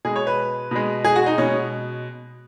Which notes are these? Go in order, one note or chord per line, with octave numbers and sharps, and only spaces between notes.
B2 G#3 G#4
C#5
B4
B2 G#3
G#4
F#4
D#4
B2 G#3 C#4